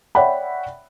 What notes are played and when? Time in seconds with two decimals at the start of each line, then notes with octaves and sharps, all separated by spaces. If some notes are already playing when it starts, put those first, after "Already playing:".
0.15 C#5 D5 E5 F#5 G5 B5